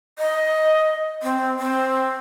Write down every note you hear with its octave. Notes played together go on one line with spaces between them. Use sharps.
D#5
C4
C4